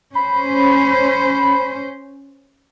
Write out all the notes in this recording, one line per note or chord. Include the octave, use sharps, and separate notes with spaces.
C#4 C5 B5